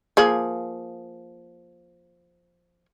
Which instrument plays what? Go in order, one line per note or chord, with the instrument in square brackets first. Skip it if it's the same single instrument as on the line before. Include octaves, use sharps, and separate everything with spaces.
[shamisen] F3 A#3 G#4